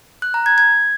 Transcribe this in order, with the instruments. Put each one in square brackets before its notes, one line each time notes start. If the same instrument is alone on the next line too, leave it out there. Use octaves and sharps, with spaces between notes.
[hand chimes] F#6
A#5
G#6
G#6